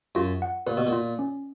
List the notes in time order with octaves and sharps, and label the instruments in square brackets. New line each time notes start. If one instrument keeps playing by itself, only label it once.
[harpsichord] F#2 [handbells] F4
[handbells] F#5
[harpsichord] A#2 [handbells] B4
[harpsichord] B2
A#2
[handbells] F4
C#4